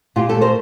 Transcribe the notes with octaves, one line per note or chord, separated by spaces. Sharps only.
A#2 F4 G4
G4 A4
A3
A#4 C5